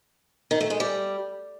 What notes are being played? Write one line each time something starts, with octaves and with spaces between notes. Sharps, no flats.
D#3
A3
G#3
G3